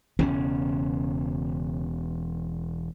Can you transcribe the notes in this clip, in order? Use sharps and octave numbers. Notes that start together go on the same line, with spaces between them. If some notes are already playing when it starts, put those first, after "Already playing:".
E1 E2 C#3 C#4